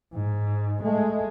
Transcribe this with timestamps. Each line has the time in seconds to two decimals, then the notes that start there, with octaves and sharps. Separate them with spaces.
0.13 G#2
0.83 G#3 A3